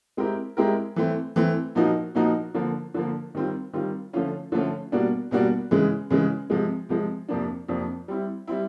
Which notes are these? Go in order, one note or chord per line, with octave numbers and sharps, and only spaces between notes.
G#3 C4 E4 G4 A#4
G#3 C4 E4 G4 A#4
E3 A3 C4
E3 A3 C4
A#2 F3 A#3 D#4 F#4
A#2 F3 A#3 D#4 F#4
D3 F3 A#3
D3 F3 A#3
D#3 G3 C4 F4
D#3 G3 C4 F4
D3 F3 A3 C#4 F4
D3 F3 A3 C#4 F4
B2 G3 A#3 D4 F#4
B2 G3 A#3 D4 F#4
C#3 E3 G#3
C#3 E3 G#3
C3 F3 G#3
C3 F3 G#3
F2 C3 F3 A#3 D4
F2 C3 F3 A#3 D4
G3 C4 E4
G3 C4 E4